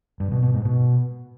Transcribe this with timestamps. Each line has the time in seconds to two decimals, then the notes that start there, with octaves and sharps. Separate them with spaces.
0.20 G2
0.31 B2
0.43 B2
0.54 G#2
0.65 B2